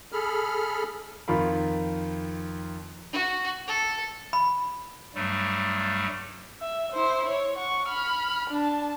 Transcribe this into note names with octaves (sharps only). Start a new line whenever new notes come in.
G#4 A4 B5 F6
F2 D#3 F4 A#4 B5
F#4
A4
B5
G2 F#3 G3 A3
E5
E4 C5
C#5
F#5 C#6
B5 F6
D4 A5